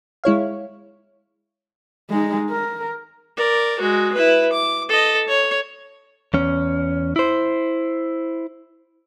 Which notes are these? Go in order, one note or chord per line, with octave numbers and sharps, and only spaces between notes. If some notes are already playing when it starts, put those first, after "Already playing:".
G#3 E4 C#5 F5
G#3 D#4
A#4
A#4 D5
G#3 F#4
E4 B4
D6
A4 D#5
C#5
E2 C#4
E4 C5